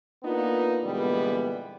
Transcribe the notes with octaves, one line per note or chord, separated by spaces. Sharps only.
A#3 B3 D4 D#4 F4
A#2 D3 E3 G3 G#3 B3